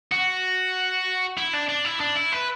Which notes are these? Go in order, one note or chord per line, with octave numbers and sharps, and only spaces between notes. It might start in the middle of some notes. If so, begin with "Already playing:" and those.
F#4
E4
D4
D4
E4
D4
E4
B4